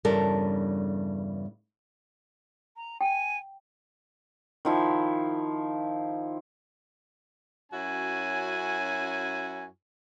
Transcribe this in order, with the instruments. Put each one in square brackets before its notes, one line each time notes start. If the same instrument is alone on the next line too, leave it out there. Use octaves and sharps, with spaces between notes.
[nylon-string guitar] E2 G2 C#3 G3 A4 A#4
[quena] A#5
[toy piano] G5 [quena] G#5
[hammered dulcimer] D#3 F3 E4
[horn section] F#2 C#4 E4 F#4 G#5